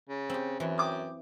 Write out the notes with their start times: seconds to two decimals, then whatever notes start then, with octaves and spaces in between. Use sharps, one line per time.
0.09 C#3
0.30 C4 G4
0.60 F#2 E3
0.78 G5 D6 D#6